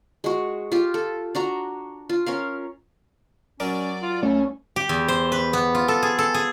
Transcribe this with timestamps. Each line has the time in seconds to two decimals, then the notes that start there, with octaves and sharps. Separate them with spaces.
0.24 G#3 F#4
0.72 F4 G4
0.94 A4
1.35 D4 F#4 A#5
2.09 F4
2.26 C#4 A#4 F5
3.60 F#3 C#4 A#4 D5
4.02 F4
4.23 C2 A3 C#4
4.76 G4
4.89 E2
5.08 C5
5.32 B4
5.53 B3
5.75 F4
5.88 A4
6.02 G#4
6.19 A4
6.34 G#4